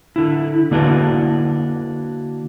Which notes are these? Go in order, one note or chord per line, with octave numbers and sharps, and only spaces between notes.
D3 E4
D3 A#3 D4 E4 F#4 B4